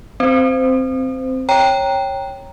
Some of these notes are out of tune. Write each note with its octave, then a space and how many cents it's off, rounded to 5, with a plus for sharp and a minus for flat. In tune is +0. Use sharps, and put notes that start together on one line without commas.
C4 +0 C5 -20
C#5 -10 G5 +0 A#5 +0